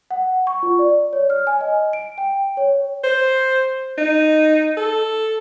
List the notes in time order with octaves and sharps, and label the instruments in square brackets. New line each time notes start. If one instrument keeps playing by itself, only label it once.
[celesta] F#5
C#6
F4
D5
C#5
F6
G#5
D#5
D7
G5
C#5
[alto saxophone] C5
D#4
A4